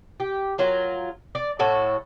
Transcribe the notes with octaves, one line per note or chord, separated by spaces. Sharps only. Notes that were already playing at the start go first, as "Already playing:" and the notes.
G4
F#3 F4 A#4
D5
A2 F#4 A4